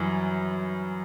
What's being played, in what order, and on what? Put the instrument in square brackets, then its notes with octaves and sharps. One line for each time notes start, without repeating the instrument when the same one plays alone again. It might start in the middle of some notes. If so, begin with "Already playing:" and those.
Already playing: [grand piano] F#2 E3 G3